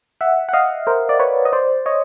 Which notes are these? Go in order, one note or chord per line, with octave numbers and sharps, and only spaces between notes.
E5 F#5
F#5
D#5 F5
A#4 C5
D5
B4 C#5
D#5
C5 D5
C#5 D#5